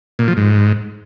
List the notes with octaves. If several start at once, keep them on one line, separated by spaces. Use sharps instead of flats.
A#2
F3
G#2